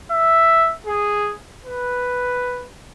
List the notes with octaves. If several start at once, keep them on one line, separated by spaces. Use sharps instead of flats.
E5
G#4
B4